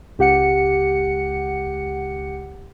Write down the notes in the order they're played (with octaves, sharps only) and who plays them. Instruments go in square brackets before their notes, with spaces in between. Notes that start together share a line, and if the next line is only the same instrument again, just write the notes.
[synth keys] C#2 G4 F#5 C#7